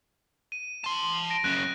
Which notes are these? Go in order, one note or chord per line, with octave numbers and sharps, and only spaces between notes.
D#7
A5 C6
A#6 D7
F#2 C#3 F#6